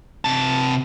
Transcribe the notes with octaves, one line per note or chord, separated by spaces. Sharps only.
C3 A5